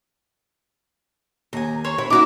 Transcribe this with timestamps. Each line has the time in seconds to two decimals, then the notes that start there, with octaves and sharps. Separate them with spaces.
1.53 D#2 G#5 A#5
1.84 C5 C#5 C#6
1.98 E4 C#5
2.10 D#4 E4 F#4 A#5 D6